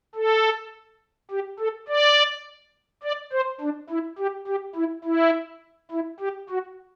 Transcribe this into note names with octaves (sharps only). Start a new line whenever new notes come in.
A4
G4
A4
D5
D5
C5
D4
E4
G4
G4
E4
E4
E4
G4
F#4